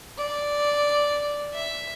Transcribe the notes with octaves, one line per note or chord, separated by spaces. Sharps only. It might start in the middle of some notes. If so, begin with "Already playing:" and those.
D5
E5